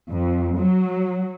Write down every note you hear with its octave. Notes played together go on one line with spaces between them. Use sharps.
F2
F#3